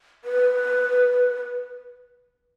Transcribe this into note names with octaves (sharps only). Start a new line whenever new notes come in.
B4